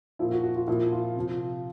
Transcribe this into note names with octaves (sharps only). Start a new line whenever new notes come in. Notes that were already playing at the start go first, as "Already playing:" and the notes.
A#2 F3 E4
F#4
F#4
F4
A#2 F3 E4
F4
C3 F3